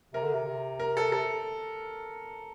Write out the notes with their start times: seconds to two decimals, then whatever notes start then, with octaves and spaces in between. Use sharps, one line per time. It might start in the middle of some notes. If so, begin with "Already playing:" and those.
0.14 C3 A#4
0.23 D3
0.34 C3
0.47 C3
0.80 A#4
0.97 A4
1.12 A4